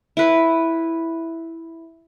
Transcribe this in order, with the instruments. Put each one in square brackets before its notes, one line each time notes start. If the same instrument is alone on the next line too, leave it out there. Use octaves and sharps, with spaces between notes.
[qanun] E4 B4